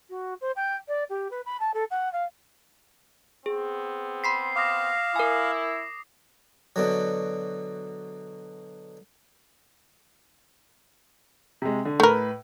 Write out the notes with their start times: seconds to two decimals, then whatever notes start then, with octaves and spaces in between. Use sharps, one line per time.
0.10 F#4
0.41 C5
0.56 G5
0.88 D5
1.10 G4
1.31 B4
1.46 B5
1.60 A5
1.74 A4
1.91 F#5
2.13 F5
3.46 B3 C4 G#4
4.24 B5 C6 B6 C7
4.56 F5 D6 D#6 A#6
5.16 E4 A#4 G#5
6.76 B2 D3 F#3
11.62 C3 G#3
11.85 D3
12.00 A2 A3 A#4 B4